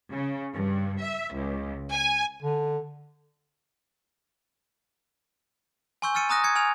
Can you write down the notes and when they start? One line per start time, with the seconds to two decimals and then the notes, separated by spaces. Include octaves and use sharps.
0.11 C#3
0.53 G2
1.00 E5
1.33 C#2
1.91 G#5
2.42 D3
6.02 G#5 C6 C#6 E6 G6
6.15 E6 F6 A6 C#7 D#7
6.29 G#5 A#5 D#6 F#6 A#6
6.44 G#6 C#7
6.55 G#5 F6 G#6 F7